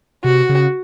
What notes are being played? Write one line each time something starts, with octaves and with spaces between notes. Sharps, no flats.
C3 F#4
C#3